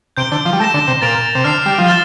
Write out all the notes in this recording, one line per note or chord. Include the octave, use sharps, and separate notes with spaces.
C3 G6 D7 G7
D3
F3
G3
A3 G6 A#6 E7
D3
C3
A#2 A6 D7 F7
C3
D3 F6 C7 F7
G3
F3
F6 A6 E7 G7